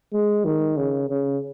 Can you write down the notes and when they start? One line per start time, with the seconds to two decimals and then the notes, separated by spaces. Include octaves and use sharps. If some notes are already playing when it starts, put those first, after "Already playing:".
0.13 G#3
0.45 D#3
0.77 C#3
1.09 C#3